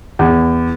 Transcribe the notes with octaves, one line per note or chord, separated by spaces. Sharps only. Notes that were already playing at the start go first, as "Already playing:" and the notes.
E2